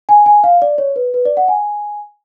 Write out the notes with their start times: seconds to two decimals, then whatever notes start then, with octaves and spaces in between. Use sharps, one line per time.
0.09 G#5
0.26 G#5
0.44 F5
0.62 D5
0.78 C#5
0.96 B4
1.14 B4
1.25 D5
1.37 F#5
1.48 G#5